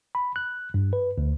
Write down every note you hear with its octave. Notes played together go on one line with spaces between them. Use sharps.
B5
F#6
G2
B4
D2